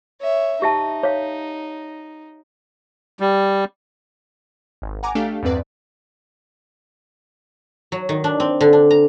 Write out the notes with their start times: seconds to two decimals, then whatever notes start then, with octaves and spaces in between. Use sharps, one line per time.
0.21 C#5 E5
0.62 D#4 G4 E5 A5
1.03 C#5 F5
3.20 G3
4.82 G#1
5.03 F#5 G#5 A#5 D6
5.15 A3 D4 G4 A4 F5
5.43 E2 G2 C4 B4 D5
7.92 F#3
8.09 D#3
8.24 D4
8.40 C4
8.61 D3
8.73 D4
8.91 A#5